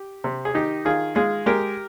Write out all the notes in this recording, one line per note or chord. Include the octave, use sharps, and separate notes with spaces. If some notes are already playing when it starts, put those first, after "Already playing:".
Already playing: G4
C3
G#4
D#3 D#4 G4
D#3 F4 G#4
G#3 F4 G#4
G#3 G4 A#4